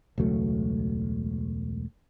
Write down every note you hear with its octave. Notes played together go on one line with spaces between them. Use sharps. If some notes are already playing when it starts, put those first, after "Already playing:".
E1 C#2 F#3 A3